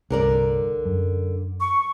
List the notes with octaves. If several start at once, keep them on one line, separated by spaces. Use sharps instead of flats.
C2 G2 D3 A#4 D5
F#2
C#6